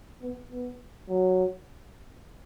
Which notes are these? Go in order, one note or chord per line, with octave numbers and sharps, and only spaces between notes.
B3
B3
F#3